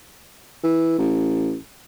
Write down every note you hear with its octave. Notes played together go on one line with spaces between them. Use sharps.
E3
A1